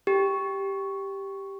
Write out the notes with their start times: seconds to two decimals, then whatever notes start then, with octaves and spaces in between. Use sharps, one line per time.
0.07 G4